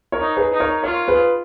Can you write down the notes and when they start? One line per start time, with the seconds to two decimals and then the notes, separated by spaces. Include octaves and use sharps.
0.12 A#4 C#5
0.21 D#4
0.37 G#4 B4
0.53 D#4
0.60 A#4 C#5
0.83 F4 A#4 C#5
1.08 G#4 B4